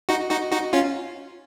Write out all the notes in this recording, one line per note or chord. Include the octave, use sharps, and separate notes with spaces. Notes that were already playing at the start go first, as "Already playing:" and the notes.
D#4 F#4
D#4 F#4
D#4 F#4
C#4 F4